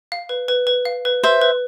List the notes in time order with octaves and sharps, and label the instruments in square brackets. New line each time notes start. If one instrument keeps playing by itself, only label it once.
[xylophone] F5
B4
B4
B4
F5
B4
[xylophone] B4 [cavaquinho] C5 E5
[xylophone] B4